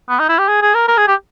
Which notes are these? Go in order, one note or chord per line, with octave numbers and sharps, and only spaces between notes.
B3
D#4
E4
G4
G#4
G#4
A#4
A#4
G#4
G4